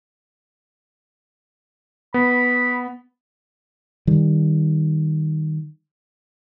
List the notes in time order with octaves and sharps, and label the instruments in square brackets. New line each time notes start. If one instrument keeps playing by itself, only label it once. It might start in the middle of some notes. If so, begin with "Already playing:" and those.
[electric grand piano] B3 [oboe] B5
[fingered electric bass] D#3 G3